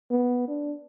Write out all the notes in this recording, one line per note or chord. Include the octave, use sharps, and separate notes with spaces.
B3
D4